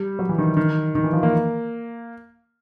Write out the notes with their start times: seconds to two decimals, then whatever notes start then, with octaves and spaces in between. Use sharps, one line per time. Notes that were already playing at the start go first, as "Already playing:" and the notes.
Already playing: G3
0.19 F#3
0.29 E3
0.38 D#3
0.57 D#3
0.95 D#3
1.04 E3
1.13 F3
1.23 A#3